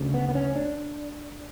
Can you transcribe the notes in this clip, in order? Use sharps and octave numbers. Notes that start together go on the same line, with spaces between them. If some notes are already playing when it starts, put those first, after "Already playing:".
Already playing: D2 C#3
B3
B3
C#4
D4